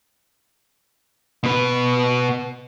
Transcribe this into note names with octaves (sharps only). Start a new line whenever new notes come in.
B2 B4